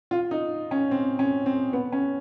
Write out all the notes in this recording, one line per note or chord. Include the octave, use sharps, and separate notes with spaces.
F4
D#4
C#4
C4
C#4
C4
B3
C#4